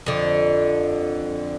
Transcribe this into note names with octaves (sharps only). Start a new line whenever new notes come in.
F2 D3